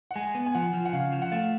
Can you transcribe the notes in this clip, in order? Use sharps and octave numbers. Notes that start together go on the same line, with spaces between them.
F#5
G#3 G#5
B3
G#5
F3 F#5
F3
F#5
C#3 F5
F3
F#5
A3 F5